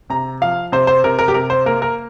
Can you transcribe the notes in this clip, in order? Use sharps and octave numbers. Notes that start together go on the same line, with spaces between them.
C3 A#5
F3 F5
C3 C5
C5
C3 A#4
A#4
G4
C3 A#4
C5
A#3 A#4
A#4